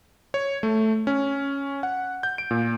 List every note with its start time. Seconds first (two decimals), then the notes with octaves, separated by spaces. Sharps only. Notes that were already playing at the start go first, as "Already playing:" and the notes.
0.34 C#5
0.63 A3
1.07 C#4
1.83 F#5
2.23 G6
2.38 D7
2.51 A#2